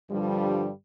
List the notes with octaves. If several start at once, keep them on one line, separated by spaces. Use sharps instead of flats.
G2 D3 F3 G3